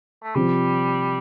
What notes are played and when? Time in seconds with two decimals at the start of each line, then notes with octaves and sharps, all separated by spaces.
0.23 A3
0.35 C3 F3 G3 C4